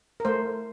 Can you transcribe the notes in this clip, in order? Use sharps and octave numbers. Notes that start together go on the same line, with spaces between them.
A#4
A3 C5